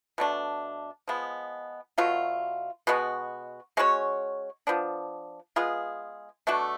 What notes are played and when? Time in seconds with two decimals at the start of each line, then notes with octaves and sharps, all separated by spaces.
0.18 B2 A3 D4
1.08 F3 G#3 B3
1.98 B2 F#3 A3 F4
2.87 B2 G#3 B3 F#4
3.77 G#3 C#4 F#4 C#5
4.67 F3 B3 D4
5.56 G#3 B3 F4 G#4
6.47 B2 A3 D4 F#4